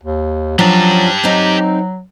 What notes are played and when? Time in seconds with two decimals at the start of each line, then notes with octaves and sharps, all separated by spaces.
0.03 D#2
0.59 F3 F#3 C#4 D4 G4 A5
1.23 F#3 C4 D#4